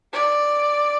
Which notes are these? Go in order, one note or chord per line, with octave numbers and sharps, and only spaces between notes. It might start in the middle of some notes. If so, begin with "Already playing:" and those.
D5